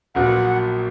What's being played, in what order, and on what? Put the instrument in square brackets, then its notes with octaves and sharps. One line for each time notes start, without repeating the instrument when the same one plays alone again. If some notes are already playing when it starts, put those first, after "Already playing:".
[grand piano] A#1 A#2 F#3 B3 [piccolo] F#5